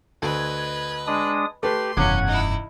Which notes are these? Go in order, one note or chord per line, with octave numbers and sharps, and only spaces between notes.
D2 B4 D#5 G#6
G#3 D4 D#6
A3 G4 B4 C6
F1 E2 G2 C#3 C#4 F#5 D6 G#6
D#4 E4